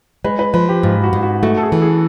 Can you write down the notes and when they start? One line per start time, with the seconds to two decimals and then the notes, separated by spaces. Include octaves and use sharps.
0.24 G#3 B4
0.39 B4
0.54 F3 B4
0.69 G4
0.83 G#2 F4
1.04 F#4
1.13 G#2
1.23 F#4
1.43 A3 F#4
1.57 A4
1.63 G#4
1.72 E3
1.82 G#4